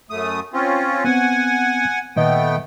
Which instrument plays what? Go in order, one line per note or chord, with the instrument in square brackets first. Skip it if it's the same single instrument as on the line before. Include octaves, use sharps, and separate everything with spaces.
[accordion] F#2 A3 D#6
C4 C#4 F4
[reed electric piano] B3 C4 [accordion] F#5 G#5
[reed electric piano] A#2 D#3 D#5 [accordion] A3 B3 G5